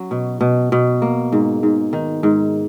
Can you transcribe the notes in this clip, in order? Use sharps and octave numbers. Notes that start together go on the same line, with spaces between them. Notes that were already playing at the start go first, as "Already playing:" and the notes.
Already playing: F#3 C#4
B2
B2
B2
A#3
G#2
G#2
D#3
G#2